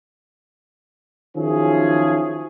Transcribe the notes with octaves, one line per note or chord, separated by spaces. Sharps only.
D#3 F3 F#3 C#4 E4 G#4